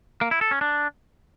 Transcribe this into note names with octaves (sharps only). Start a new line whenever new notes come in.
A#3
E4
A4
C#4
D4